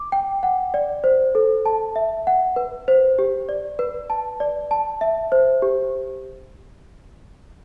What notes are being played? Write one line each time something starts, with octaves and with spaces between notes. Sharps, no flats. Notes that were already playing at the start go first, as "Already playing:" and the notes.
Already playing: D6
G5
F#5
D5
C5
A4
A5
E5
F#5
B4
C5
G4
D5
B4
A5
D5
A5
E5
C5
G4